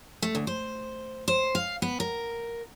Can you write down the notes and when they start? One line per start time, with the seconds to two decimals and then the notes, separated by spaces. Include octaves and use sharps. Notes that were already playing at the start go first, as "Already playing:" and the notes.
0.22 A3
0.35 D2
0.47 C5
1.28 C5
1.55 F5
1.82 B3
2.00 A#4